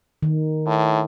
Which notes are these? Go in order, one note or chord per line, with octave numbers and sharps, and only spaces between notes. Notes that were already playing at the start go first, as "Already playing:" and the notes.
D#3
A2